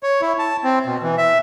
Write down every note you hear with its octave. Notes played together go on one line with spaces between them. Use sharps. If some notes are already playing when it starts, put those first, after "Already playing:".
C#5
E4
A5
C4
B2
E3
E5